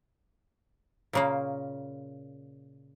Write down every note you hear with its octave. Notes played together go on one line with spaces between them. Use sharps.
A#2 C#3 A#3